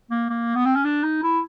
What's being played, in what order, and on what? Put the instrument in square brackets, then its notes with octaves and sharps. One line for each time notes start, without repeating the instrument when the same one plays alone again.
[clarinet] A#3
A#3
B3
C4
C#4
D4
D#4
E4